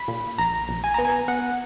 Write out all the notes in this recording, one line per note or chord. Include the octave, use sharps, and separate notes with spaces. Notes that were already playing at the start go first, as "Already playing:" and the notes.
Already playing: B5
A#2
A#1 A#5
A#1
G#5
B3 A#5
G#5
B3 F#5